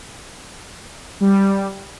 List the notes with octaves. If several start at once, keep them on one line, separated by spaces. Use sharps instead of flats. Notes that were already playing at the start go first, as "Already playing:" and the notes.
G3